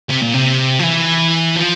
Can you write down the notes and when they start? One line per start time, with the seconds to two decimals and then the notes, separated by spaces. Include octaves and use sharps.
0.10 C3
0.22 A#2
0.34 C3
0.79 F3
0.83 E3
1.56 F3